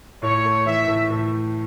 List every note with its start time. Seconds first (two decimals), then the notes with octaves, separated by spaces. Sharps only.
0.22 A2 C#5
0.44 A3
0.66 E3 E5
0.87 A2
1.10 A2